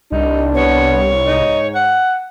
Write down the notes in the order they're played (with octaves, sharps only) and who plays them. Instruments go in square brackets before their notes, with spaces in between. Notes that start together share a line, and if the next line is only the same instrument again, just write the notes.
[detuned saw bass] C2 [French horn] D4 [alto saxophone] D#4
[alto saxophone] B3 [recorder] C#5
[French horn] G#2 [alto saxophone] D#4
[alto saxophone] F#5